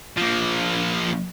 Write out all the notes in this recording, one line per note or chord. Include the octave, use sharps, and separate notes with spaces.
F3 A#3